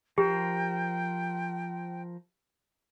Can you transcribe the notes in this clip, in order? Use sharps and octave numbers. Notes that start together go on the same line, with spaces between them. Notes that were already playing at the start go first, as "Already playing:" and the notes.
F3 G4 A#4 C5 G5